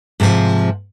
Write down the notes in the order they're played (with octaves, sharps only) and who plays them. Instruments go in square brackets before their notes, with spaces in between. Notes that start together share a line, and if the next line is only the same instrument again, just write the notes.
[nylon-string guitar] G#2 C3 E3 F3